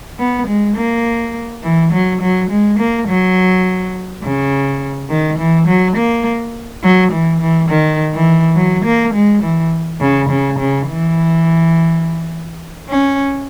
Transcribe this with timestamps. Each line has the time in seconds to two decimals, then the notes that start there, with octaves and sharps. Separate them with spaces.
0.19 B3
0.47 G#3
0.76 A#3
1.63 E3
1.92 F#3
2.21 F#3
2.50 G#3
2.79 A#3
3.08 F#3
4.23 C#3
5.10 D#3
5.38 E3
5.67 F#3
5.96 A#3
6.83 F#3
7.12 E3
7.41 E3
7.69 D#3
8.13 E3
8.56 F#3
8.85 A#3
9.14 G#3
9.43 E3
10.01 C#3
10.30 C#3
10.59 C#3
10.87 E3
12.89 C#4